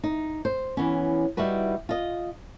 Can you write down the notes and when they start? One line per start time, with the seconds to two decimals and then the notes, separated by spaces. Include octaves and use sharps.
0.03 D#4
0.45 C5
0.77 E3 B3 C#4
1.37 G3 D#4 E4 F#4 B4
1.89 F4 D#5